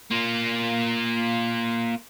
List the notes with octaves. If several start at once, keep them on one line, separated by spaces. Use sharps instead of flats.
A#3 F4